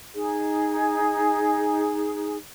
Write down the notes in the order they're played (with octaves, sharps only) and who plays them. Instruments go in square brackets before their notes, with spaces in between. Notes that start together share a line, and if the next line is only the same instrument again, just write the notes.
[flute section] D#4 G#4